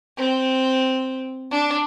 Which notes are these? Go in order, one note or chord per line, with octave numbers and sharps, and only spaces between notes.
C4
D4